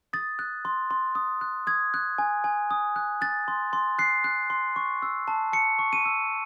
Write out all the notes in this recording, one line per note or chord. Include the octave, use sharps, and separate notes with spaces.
D#6 A6
F#6
C6
C6
D#6
F#6
D#6 G#6
F#6
G#5
G#5
D#6
F#6
F#6 A6
C6
C6
F#6 C7
F#6
C6
C#6
E6
A5
A5 C#7
C#6
D#7
E6